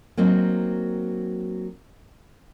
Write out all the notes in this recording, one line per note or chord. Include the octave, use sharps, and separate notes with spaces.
F#3 A#3 C4 D#4